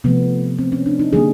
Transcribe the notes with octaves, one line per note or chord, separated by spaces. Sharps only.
C3 F3 A3 B3
C4
C#4
D4
D#4
D3 G3 A#3 G#4